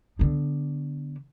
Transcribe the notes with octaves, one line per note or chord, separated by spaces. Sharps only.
D3 B3